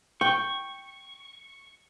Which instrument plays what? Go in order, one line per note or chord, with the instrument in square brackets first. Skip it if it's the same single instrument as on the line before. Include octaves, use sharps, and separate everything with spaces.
[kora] G5 [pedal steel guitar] C#6